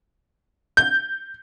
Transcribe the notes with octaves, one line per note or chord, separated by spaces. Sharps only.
G6